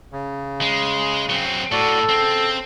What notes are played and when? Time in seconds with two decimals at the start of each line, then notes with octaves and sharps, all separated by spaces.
0.12 C#3
0.61 G#3
1.30 F#3 C4
1.72 A2 F#4 A4 D5
2.09 C#3 C4